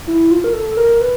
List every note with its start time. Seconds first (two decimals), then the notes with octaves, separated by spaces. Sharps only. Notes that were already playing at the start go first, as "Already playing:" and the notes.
0.07 E4
0.31 F4
0.44 A#4
0.53 A4
0.77 A#4
1.01 B4